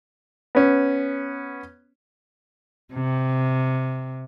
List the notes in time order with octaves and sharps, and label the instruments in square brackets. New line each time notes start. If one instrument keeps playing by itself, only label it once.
[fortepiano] B3 C#4
[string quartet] C3